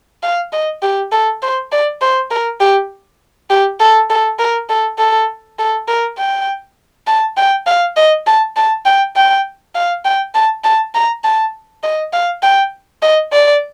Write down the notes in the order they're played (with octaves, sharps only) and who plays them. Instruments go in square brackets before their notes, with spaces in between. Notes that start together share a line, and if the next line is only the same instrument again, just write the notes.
[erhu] F5
D#5
G4
A4
C5
D5
C5
A#4
G4
G4
A4
A4
A#4
A4
A4
A4
A#4
G5
A5
G5
F5
D#5
A5
A5
G5
G5
F5
G5
A5
A5
A#5
A5
D#5
F5
G5
D#5
D5